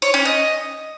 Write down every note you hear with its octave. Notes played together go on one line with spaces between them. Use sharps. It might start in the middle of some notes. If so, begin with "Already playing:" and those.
C#5
C#4
D#5